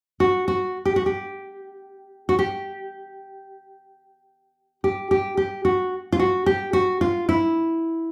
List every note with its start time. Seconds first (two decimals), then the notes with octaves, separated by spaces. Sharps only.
0.20 F#4
0.48 F#4
0.85 G4
0.96 F#4
1.06 G4
2.29 F#4
2.39 G4
4.84 G4
5.11 G4
5.37 G4
5.65 F#4
6.12 F4
6.19 F#4
6.46 G4
6.73 F#4
7.01 F4
7.29 E4